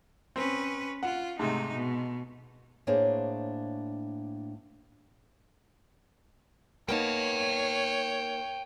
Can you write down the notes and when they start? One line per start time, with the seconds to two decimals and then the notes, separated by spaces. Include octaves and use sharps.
0.36 C4 C#4 B4
1.03 F4 F#5
1.39 G#2 C3 A3 D#4
1.75 B2
2.87 A2 A#3 D4 G#4 C5 C#5
6.89 A#3 B3 D#4 C#5 G5 A5